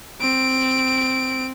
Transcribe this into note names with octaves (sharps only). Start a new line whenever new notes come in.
C4 D7